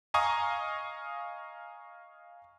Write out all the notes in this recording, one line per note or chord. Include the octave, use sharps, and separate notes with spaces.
D#5 F5 G#5 A#5 C#6 D#6